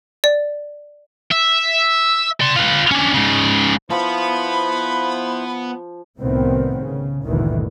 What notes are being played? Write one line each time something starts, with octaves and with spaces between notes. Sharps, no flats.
D5
E5
D5 C6
F4 B4
C#4 D4
G#2 C#3
F3 B3 E4 C5 F5 B5
C2 A2 C3 D#3 B3 C4
C#3
G1 D2 G2 A#2 D#3 E3